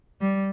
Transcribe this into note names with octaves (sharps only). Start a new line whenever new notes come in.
G3